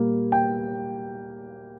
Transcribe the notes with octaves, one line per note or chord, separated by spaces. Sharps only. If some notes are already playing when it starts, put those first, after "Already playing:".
Already playing: A#2 G3 A#3
G5